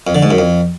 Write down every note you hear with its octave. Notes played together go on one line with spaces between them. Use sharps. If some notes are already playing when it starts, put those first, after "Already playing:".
F2
D3
G#2
F#2
F2